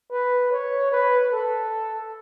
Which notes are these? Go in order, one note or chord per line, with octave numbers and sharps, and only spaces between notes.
B4
C#5
B4
A4